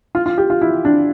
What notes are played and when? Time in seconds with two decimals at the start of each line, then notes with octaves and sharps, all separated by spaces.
0.15 F4
0.26 F4
0.38 G4
0.50 F4
0.62 E4
0.85 D4